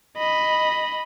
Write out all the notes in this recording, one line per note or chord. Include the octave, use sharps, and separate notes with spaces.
D#5 B5